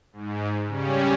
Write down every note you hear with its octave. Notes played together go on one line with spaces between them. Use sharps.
G#2
C#3 G3 C#4